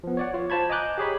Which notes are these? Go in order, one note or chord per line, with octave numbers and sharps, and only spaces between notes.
F3 B3
C#5 D5 F#5
F4 C#5
F4 C5 A5 B5 G#6
D#5 G#5 A#5 D6 F#6 G6
G4 G#4 C#5 B5